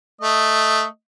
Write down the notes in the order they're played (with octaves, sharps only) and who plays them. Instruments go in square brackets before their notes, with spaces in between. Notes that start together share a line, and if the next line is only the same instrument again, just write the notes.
[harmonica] A3 D#5